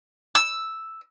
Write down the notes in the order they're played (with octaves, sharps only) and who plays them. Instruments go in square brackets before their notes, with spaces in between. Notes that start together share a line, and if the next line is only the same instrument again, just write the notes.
[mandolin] E6